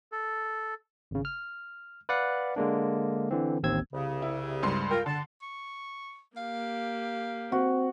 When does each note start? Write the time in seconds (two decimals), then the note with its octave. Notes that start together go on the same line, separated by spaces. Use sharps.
0.12 A4
1.11 G#1 C#3
1.25 F6
2.09 B4 D5 F5 F#5
2.56 D3 G#3 A#3 D4
3.31 D3 E3 C4
3.63 A1 D#2 C4 E6 G#6
3.93 C2 C#3
4.22 E4
4.63 C#2 G2 C6
4.91 F4 A#4 G5
5.06 D3 A5
5.42 C#6
6.37 A#3 G4 F5
7.52 C4 F#4